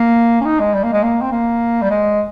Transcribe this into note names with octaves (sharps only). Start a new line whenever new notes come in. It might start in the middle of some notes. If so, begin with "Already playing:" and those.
Already playing: A#3
C#4
D#4
G#3
G3
A#3
G#3
A#3
C4
A#3
G3
G#3